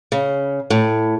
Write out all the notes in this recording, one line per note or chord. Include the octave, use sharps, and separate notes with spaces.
C#3
A2